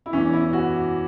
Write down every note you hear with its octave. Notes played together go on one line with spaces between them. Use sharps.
E4
E2 E3 C#4
E4
F#4